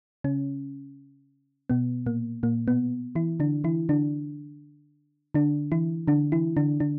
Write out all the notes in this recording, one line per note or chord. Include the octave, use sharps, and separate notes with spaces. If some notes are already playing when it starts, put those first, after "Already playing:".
C#3 C#4
B2 B3
A#2 A#3
A#2 A#3
B2 B3
E3 E4
D3 D4
E3 E4
D3 D4
D3 D4
E3 E4
D3 D4
E3 E4
D3 D4
D3 D4